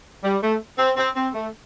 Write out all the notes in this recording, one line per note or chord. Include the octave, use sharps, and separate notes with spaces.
G3
A3
C4
C4
C4
A3